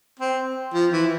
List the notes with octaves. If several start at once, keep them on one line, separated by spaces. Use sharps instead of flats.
C4
F3
E3